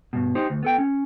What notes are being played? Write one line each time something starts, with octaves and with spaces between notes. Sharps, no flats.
G2 B2
D#4 G4 C5
D2
B3 A4 G5
C#4